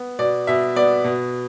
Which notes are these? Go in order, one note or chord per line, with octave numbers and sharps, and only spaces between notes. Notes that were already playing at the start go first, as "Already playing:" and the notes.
Already playing: B3
B2 D5
B2 E5
B3 D5
B2